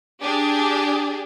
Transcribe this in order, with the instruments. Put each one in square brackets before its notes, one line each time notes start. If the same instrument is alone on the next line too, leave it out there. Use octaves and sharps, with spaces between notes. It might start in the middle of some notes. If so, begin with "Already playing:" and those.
[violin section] D4 G4 G#4